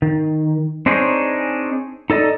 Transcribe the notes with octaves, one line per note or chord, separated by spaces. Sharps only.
D#3
C4 D4 D#4 G#4 C5 C#5
D#4 A4 D5 D#5